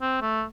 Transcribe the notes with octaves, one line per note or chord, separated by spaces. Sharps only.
C4
A3